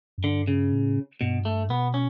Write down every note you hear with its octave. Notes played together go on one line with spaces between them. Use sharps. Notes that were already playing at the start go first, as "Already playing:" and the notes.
F#2
G2 D3
C#3
A2
G2 B2
A3
B2 B3
C#4